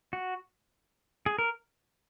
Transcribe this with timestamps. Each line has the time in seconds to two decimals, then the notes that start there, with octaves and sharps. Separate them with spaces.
0.13 F#4
1.26 G#4
1.39 A#4